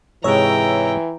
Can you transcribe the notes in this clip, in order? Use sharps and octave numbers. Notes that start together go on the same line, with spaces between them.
G#2 C3 E3 G#3 C#5 G5 A#5 E6